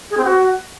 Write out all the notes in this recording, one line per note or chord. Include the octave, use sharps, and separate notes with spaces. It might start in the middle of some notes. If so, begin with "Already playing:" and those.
G#4
C4
F#4